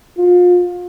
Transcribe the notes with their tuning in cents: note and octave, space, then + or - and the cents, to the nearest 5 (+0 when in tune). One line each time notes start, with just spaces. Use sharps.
F4 +30